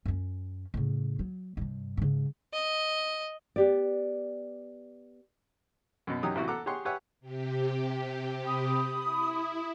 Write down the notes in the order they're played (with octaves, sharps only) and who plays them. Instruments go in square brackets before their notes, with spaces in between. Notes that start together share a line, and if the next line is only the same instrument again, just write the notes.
[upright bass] F#2 C#4
A2 C#3
F#3
G2 C3
G#2 C#3
[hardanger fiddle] D#5
[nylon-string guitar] B3 G4 D5
[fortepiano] F#2 B2
F#2 F#3 D#4 G4 D#6
A1 C3 E3 E4 F#4
A4 F#5 A#5 D6
G4 G#4 C#5 F#5 C6 C#6
G4 B4 C#5 E5 F#5 G#5
[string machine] C3 G4
[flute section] B5 D#6
[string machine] E4